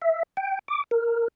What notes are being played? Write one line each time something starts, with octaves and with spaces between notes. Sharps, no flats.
E5
G5
D6
A#4